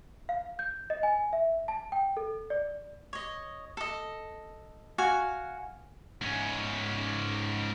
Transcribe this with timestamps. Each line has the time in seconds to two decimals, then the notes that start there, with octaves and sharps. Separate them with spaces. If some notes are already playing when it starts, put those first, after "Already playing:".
0.29 F5
0.59 G6
0.90 D#5
1.03 G#5
1.33 E5
1.68 A5
1.92 G5
2.17 A4
2.50 D5
3.13 C#5 D#5
3.77 A4 D#5
4.98 F#4 F5 G#5
6.22 G#2 C#4